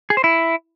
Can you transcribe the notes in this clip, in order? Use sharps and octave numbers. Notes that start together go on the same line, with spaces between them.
G#4
C5
E4